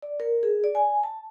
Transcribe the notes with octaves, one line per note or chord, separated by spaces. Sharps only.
D5
A#4
G#4
D5
G#5
A5